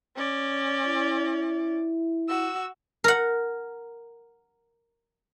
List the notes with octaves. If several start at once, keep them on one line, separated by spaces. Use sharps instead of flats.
C#4 D5
E4
F#4 E6
A#4 F#5